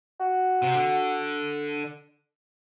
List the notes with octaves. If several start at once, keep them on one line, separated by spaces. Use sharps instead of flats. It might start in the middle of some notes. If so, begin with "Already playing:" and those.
F#4
C3
D3